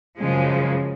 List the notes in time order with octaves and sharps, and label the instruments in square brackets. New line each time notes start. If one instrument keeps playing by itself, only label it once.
[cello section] F#2 C#3 F3 G#3